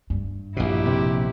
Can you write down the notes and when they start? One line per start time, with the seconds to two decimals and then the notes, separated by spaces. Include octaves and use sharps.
0.10 G2
0.57 A#1 B2 E4 G4
0.86 C3